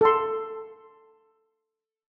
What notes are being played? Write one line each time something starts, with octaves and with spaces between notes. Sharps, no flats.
A4 C6